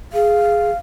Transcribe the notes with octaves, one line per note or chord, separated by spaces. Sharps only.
G#4 F5